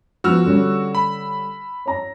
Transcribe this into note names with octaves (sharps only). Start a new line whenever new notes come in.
F3 B3 F#4 E6 F6
D3 G3 C#4
B5
C#5 A#5